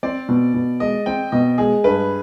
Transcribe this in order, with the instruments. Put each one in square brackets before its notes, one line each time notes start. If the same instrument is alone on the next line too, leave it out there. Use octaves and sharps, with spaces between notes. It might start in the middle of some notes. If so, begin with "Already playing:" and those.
[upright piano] C4 [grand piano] D5
[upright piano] B2
B2
[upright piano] G#3 [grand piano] D#5
[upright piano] C4 [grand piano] G5
[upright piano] B2 [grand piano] D#5
[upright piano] G#3 [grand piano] G#4
[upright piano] G2 [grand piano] B4